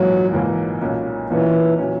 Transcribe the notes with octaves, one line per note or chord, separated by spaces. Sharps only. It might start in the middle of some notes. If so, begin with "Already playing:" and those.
Already playing: A#1 G#2 E3 F#3 A#3
A#1 G#2 E3 A#3
B1 A#2 A#3 C#4
B1 A#2 E3 A#3 C#4
A#2 F#3 C#4